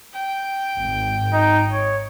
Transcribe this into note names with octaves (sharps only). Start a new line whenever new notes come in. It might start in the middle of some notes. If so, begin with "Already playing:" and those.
G5
G#1
D#4
C#5